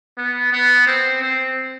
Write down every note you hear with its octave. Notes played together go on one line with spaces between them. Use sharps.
B3
B3
C4
C4